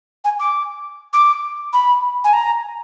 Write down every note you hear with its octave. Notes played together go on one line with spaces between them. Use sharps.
G#5
D6
D6
B5
G#5
A#5